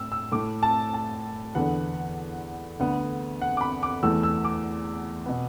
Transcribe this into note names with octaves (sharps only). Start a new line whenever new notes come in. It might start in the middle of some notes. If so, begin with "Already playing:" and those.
Already playing: A2 E6
E6
A2 A3 D6
A5
A5
E2 D3 B3 F#5
D2 D3 B3
F#5
D6
B5
D6
E2 E3 A3 E6
E6
D6
B2 B3